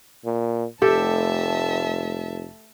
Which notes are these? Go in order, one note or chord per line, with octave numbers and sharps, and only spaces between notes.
A#2
F1 A3 G4 A4 E5 A5